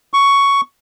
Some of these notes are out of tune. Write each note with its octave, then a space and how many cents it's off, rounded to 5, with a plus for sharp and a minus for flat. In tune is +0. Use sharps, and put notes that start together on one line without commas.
C#6 +10